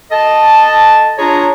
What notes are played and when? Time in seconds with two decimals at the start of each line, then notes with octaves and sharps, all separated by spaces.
0.12 A4 D#5 A5
1.18 D4 F4 G#4 C#5 A#5